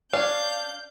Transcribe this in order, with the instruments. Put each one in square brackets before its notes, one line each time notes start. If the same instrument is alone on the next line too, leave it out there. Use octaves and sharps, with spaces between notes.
[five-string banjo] D4 [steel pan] C#5 [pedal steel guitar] F5 [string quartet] G6